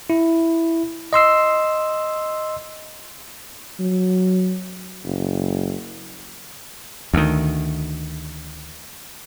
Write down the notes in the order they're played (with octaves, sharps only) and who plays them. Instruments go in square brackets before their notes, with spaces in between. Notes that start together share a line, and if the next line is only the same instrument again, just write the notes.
[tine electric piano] E4
D#5 C6 E6 C7
[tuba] F#3
F#1
[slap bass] D2 D#3